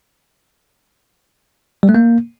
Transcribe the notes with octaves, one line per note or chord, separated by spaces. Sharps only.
G3
A3
A#3